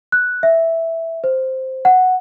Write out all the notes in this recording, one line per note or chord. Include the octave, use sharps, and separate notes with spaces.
F#6
E5
C5
F#5